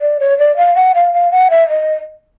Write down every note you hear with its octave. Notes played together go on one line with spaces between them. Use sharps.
D5
C#5
D5
F5
F#5
F5
F5
F#5
E5
D#5